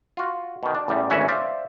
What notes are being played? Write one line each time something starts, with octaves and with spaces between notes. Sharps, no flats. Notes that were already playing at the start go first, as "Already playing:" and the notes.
F4 F#4
B2 D#3
D4
A1 E2 G3
G#1 D2 E3 C#4 E5 F#5
C5 D5 E5 F5